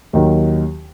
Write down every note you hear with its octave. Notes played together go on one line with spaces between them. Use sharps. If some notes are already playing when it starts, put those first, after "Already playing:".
D#2 D#3 F#3